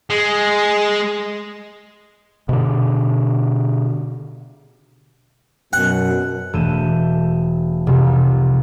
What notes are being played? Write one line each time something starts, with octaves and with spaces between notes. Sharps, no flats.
G#3
B2 D3
F#2 B2 F#5
E1 A3 G6 D#7 E7
F1 C2